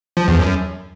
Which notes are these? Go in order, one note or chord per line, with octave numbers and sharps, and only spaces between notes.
F3
E2
F#2